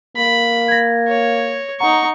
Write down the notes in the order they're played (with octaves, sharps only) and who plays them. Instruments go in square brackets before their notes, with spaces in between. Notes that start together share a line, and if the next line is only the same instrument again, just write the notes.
[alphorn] A#3 [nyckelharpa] B5
[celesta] G#6 A#6
[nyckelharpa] C#5
[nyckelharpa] D#4 C#6 [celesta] F#5 A#5